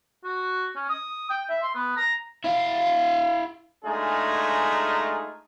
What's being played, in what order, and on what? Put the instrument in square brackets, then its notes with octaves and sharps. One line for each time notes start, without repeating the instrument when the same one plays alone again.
[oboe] F#4
C#4
D#6
G5
E5
C6
B3
A#5
[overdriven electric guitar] E4 F5
[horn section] G#3 A3 D4 D#4 F4 G#4